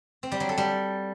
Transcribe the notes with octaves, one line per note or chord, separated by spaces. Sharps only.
C4
G3
F#3
A4
G3